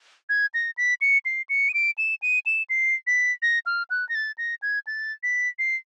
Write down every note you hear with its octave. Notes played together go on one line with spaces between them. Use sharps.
G#6
A#6
B6
C#7
C7
C#7
D#7
D7
E7
D#7
E7
C7
B6
A#6
F6
F#6
A#6
A6
A#6
G#6
A6
B6
C7